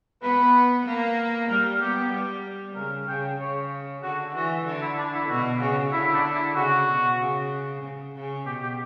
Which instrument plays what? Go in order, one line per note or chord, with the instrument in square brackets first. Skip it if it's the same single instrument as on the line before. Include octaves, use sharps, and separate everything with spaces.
[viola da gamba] B3 [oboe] B4
[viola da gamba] A#3
[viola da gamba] G3 [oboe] A#4
[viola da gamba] B3 [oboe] G4
[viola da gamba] G3
[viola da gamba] C#3 [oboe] A#4
[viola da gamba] C#3 [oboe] G5
[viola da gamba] C#3 [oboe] C#5
[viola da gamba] D3 [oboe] F#4
[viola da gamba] E3 [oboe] F#4
[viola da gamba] D3
[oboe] E4
D4
E4
[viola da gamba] B2 [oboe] F#4
[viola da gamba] C#3 [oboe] F#4
[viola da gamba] D3 [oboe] E4
[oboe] E4
D4
E4
[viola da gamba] C#3 [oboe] F#4
[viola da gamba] B2
C#3
C#3
C#3
[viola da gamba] B2 [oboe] G4
[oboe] G4